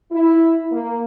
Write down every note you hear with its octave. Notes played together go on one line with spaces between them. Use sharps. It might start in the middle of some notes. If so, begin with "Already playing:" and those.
E4
A#3